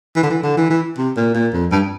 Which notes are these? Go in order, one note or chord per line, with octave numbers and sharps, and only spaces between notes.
E3
D3
E3
D3
E3
E3
C3
A#2
A#2
F2
G2